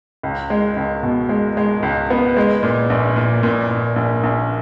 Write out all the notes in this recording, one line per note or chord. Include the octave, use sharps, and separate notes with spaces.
C#2
G#3
C#2
B2
G#3
G#3
C#2
B3
G#3
A#2
A#1
A#2
A#2
A#2
A#1
A#1